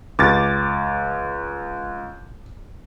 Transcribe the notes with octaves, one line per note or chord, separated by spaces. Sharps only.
C#2 D6 A6